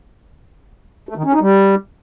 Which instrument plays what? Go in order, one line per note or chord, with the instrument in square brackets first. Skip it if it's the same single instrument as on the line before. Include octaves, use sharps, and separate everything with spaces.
[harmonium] A3
D#3
C#4
D#4
G3